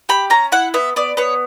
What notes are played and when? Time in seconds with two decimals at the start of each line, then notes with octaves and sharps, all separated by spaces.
0.09 G4 B5
0.30 C#4 A#5
0.52 E4 F#5
0.74 B3 E5
0.96 B3 D5
1.17 B3 C#5